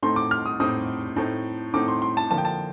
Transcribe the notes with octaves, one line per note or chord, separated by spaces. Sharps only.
A2 A3 C4 D#4 C6
D6
F6
D#6
A2 A3 C4 D#4 D#6
A2 A3 C4 D#4
A2 A3 C4 D#4 D6
C6
C6
A5
D3 F3 A#3 A5
G5
A5